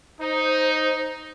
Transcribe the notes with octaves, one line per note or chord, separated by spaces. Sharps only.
D#4 C5